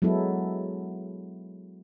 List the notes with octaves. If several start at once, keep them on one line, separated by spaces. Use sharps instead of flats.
F#3 G#3 B3 E4 A4